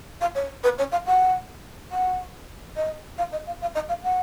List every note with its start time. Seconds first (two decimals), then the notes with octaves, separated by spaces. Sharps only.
0.21 F5
0.35 C#5
0.64 B4
0.78 C#5
0.92 F5
1.06 F#5
1.91 F#5
2.76 D#5
3.18 F5
3.32 D#5
3.47 F5
3.61 F5
3.75 D#5
3.89 F5
4.03 F#5